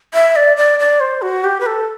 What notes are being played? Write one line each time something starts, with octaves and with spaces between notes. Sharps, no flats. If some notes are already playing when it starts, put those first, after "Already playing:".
E5
D5
D5
D5
C5
F#4
G4
B4
A4